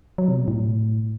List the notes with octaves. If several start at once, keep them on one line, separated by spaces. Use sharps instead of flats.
F#3
C3
B2
A2